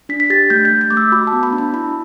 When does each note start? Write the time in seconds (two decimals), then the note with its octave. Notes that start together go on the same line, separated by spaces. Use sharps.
0.09 D4 B6
0.20 B6
0.30 G4 A6
0.50 A3 G6
0.65 G6
0.71 A3
0.81 G6
0.90 A3 D6
0.97 E6
1.12 F#4 B5
1.27 A5
1.33 B3
1.43 B5
1.53 D4
1.58 B5
1.73 E4 B5